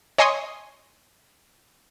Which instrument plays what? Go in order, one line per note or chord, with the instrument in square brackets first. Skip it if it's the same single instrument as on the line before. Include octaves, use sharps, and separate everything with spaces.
[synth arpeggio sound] C#5 D#5 G#5 C6 C#6 D#6